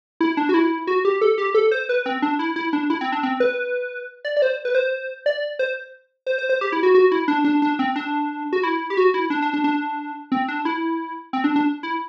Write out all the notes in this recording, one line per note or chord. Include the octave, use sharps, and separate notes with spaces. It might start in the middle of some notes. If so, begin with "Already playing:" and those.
E4
D4
F#4
E4
F#4
G4
A4
G4
A4
C5
B4
C4
D4
E4
E4
D4
E4
C4
D4
C4
B4
D5
D5
C5
B4
C5
D5
C5
C5
C5
C5
G4
E4
F#4
F#4
E4
D4
D4
D4
C4
D4
F#4
E4
G4
F#4
E4
D4
D4
D4
D4
C4
D4
E4
C4
D4
D4
E4